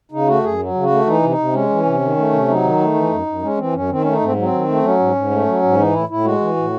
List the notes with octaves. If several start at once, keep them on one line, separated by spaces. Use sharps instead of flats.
C#3 D#4
A3 F#4
F#2 G#4
F#3
C#3
F#4
A3
E3 D#4
C3
D#4
C3
G#3 C#4
E3
C3
D#3
A3
C3
F#3 D#4
D#3
A3
E3
F#2
F#2
G#3 C#4
E3 C4
F#2 C#4
D#3 C4
A3 C#4
D#4
G#2 C4
F#3
C4
D#3
A3
F#3 C#4
G#2
G#2
A3
F#3
G#2
E3 D#4
A2 E4
A2 E4
G#3 F#4
E3
A2